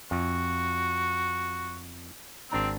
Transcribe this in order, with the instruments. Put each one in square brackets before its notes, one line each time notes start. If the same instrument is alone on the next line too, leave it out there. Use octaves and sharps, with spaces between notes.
[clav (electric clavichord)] F2 [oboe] F#4
[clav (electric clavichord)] G#1 D4 A#5 [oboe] C4